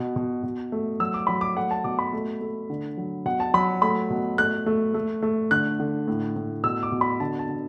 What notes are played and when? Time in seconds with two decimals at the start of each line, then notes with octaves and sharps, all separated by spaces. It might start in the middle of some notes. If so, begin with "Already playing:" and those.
Already playing: B2
0.16 B2
0.43 B2
0.72 A3
1.00 F#3 E6
1.14 D6
1.27 F#3 B5
1.41 D6
1.57 A3 F#5
1.71 A5
1.84 B2 D6
1.99 B5
2.13 A3
2.41 A3
2.70 D3
2.97 F#3
3.25 B2 F#5
3.40 A5
3.54 F#3 B5
3.82 A3 B5
4.10 B2
4.38 A3 F#6
4.66 A3
4.94 A3
5.23 A3
5.51 D3 F#6
5.80 D3
6.08 A2
6.36 A2
6.64 B2 E6
6.83 D6
6.92 B2
7.01 B5
7.20 D3 A5
7.39 A5
7.48 D3